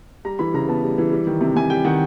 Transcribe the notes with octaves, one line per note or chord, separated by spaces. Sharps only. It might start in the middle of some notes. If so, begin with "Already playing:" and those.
G3 A#5
E3 B5
C#3 A#5
B3 A5
G3
E3
G3
D#3
C3
C3 G#5
G3 G5
D#3 F#5